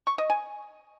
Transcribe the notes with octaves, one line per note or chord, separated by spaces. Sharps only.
C#6
D#5
G#5